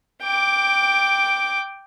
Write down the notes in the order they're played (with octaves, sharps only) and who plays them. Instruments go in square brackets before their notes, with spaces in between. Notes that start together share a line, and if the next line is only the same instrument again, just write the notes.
[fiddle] G5 D6